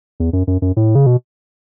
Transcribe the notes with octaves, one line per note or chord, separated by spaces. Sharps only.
E2
F#2
F#2
F#2
A2
C#3
B2